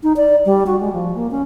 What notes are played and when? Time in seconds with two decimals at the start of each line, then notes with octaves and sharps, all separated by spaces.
0.03 D#4
0.17 D5
0.46 G3
0.67 F#4
0.80 G#3
0.93 F3
1.15 A#3
1.31 C#4